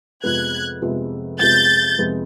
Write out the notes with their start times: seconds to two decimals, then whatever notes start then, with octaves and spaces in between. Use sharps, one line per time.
0.24 F2 C3 F3 G#3 B3 F#6 G#6
0.82 F2 C3 F3 G#3 B3
1.40 F2 C3 F3 G#3 B3 G6 A6
1.98 F2 C3 F3 G#3 B3